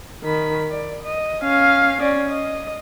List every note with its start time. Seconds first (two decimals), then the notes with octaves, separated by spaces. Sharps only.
0.24 D#3 B5
0.71 D5
1.03 D#5
1.42 C#4 F5
2.01 C#4 D5
2.30 D#5